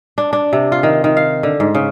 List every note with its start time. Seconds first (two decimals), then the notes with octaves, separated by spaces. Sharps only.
0.18 D4
0.33 D4
0.53 C3
0.72 F4
0.83 D#3
1.04 D#3
1.17 F5
1.43 D3
1.60 G#2
1.75 C#3